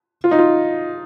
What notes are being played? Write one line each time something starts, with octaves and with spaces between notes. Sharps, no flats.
F4
D#4
F4